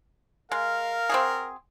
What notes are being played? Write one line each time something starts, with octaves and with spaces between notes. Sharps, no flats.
G#3 A#4 F5
C4 F#4 G#4